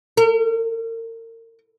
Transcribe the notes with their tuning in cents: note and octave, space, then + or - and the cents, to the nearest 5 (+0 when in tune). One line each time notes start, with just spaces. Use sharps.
A#4 -40